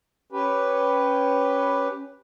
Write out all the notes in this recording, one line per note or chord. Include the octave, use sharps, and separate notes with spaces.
C#4 G4 B4